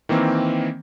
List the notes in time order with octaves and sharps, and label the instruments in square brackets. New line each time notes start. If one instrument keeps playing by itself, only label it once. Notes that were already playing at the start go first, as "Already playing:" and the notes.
[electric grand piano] D#3 E3 A#3 C4